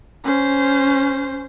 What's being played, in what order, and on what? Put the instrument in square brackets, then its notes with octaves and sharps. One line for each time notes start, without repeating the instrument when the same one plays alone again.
[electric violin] C#4 C5